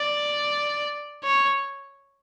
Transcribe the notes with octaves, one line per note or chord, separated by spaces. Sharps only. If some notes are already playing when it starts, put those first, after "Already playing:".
Already playing: D5
C#5